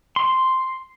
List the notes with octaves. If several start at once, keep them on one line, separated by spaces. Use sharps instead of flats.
C6